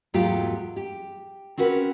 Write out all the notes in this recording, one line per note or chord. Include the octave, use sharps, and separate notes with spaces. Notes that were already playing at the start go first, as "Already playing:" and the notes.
E2 G#2 F#3 A3 F4 G4
G4
C4 C#4 F#4 A#4 B4